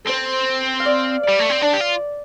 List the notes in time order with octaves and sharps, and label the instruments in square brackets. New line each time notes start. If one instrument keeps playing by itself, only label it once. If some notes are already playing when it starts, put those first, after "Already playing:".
[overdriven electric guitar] C4 [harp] A4 C5
[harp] F5
D5
D5
[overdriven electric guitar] G3
A3
C4
[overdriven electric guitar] D4 [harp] D5
[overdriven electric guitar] G4
F4